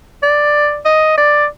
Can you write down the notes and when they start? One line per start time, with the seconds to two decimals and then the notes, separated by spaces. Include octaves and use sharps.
0.23 D5
0.85 D#5
1.17 D5